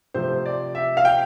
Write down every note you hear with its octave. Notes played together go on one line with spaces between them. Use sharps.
C3 F3 A3 C5
D5
E5
F5
G5